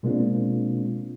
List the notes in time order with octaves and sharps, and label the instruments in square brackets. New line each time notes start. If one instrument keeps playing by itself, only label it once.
[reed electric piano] B2 G#3 A#3 C4 D4 F4